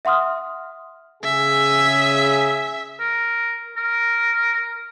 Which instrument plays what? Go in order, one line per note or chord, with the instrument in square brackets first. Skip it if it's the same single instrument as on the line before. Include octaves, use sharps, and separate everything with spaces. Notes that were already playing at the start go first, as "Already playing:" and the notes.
[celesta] E5 F#5 C6 D#6 F6
[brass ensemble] C#3 G#4 [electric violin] E5
[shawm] A#4
A#4